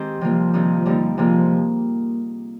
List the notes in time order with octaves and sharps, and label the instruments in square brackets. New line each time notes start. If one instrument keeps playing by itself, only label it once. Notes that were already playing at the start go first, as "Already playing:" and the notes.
Already playing: [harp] D#3 G#3 C4 G4 C5
[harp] C3 G3 A#3 F4 [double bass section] F3
[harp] C3 D#3 G3 C4 F4
G2 D3 G3 A#3 D#4
[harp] C3 G3 A#3 F4 G#4 [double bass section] F3